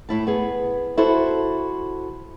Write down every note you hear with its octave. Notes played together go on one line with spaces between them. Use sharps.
A2 E4 A5
B3 G#4
E4 F#4 A4 C5